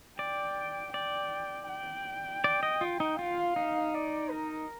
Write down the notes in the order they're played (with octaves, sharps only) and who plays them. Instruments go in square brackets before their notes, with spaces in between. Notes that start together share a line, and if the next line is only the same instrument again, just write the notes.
[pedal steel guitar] D5 [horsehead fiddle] G5
[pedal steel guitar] D5 [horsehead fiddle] G5
[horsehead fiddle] G5
[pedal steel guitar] D5
D#5
F4
D#4
[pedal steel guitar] F4 [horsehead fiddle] F5
[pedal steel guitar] D#4
[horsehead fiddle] D5
A#4